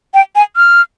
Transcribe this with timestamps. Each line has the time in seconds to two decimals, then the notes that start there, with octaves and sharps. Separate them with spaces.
0.14 G5
0.36 G#5
0.56 F6